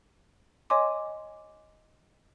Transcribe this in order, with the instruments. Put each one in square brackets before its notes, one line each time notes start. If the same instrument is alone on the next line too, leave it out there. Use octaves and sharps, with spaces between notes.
[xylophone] C#5 D#5 G#5 C6 D6